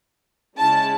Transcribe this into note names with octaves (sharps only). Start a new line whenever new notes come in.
C#3 G#3 C#4 E4 A5